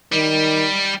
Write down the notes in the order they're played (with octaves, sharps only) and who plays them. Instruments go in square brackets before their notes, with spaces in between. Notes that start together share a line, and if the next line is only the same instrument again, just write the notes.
[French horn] D#3 [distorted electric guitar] G3